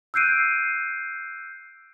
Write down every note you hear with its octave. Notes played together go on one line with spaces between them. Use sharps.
E6 F#6 G6 C7 D7 D#7